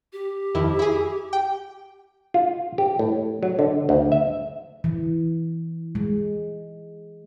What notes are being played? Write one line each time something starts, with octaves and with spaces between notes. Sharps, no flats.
G4
F2 D#3 E4
E4 G#4
G5
F4
G4
A2
F#3
D3
D2
E5
E3
G#3